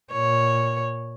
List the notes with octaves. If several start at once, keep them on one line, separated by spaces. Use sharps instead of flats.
A#2 C#5